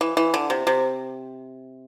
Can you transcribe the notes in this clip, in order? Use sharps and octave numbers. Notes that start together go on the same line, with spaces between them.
E3
E3
D3
C3
C3